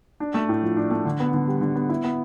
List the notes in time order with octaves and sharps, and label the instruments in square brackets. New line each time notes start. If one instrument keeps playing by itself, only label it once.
[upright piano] D4
A3
A2
F3
D4
A3
D3
B3
D3
G3
D3
B3
E4
B3